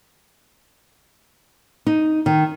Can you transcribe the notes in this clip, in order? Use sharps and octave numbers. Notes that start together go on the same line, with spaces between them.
D#4
D#3